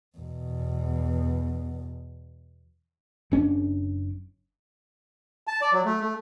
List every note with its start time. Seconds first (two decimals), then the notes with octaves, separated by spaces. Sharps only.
0.17 E2 B2
3.31 F#1 C#4 D4
5.47 A5
5.61 D5
5.73 F#3
5.85 A3
6.01 A3